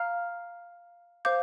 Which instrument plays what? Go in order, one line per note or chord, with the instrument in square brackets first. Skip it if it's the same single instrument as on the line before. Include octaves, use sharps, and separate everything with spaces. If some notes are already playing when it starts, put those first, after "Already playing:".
Already playing: [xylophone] F5 A#5 F6
C5 F5 D6 G6